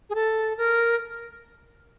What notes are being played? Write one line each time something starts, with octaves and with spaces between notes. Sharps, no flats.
G#4
A4
A#4